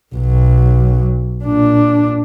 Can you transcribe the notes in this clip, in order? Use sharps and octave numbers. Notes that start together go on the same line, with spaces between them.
B1 F#3
A#2 D4